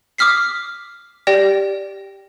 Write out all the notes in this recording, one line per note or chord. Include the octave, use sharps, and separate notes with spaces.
D6 D#6 F6 B6 C7
G4 D5 G5 A#6